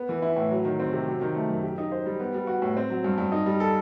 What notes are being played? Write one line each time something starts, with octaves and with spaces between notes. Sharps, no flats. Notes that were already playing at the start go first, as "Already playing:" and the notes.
Already playing: B3
E3
E4
A2
F#3
D#3
C4
C3
F#3
D#3
A3
F#2
G4
D#4
C5
G3
B3
G3
F#4
A2
C4
F#3
G2
G2
D#4
G3
A4